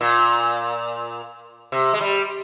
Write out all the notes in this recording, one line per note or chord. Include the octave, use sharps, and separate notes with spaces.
A#2
C3
G#3
G3